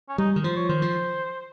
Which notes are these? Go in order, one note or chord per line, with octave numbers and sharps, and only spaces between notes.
C#4
G3 D#4
D#3
F3 C5
C#5
D#3 C5
F3